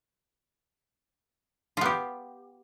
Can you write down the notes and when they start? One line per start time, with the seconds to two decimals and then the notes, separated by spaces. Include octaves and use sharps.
1.77 F4
1.81 B3
1.85 G4